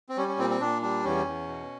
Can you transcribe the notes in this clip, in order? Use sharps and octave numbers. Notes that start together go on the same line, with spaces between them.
C4
G3 C#4
C#4
A#2 C4
C4
A#2 D4
G3 D4
E2 C#4
E2
B2